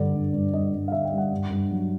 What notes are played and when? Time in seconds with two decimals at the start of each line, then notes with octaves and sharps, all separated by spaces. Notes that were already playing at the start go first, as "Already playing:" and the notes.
Already playing: G2 D3 D5
0.14 G2
0.33 G2
0.53 G2 D#5
0.73 G2
0.88 F5
0.92 D3 E5
1.05 G5
1.12 G3
1.18 F#5
1.31 G2
1.50 G2
1.71 F#3